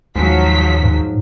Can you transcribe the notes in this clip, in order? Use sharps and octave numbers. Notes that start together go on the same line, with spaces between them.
D#2 G#2 F3 F#3 B6
G#2